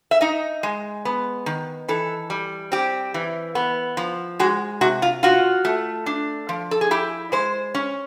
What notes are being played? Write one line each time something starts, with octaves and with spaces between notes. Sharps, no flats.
E5
D#4 D#5
G#3
B3
D#3
E3 A4
G3
C4 G4
E3
B3
F3
G#3 F#4
C3 F#4
F4
F4 F#4
A3
D4
F3
A4
G#4
E4 G4
G#3 C5
C#4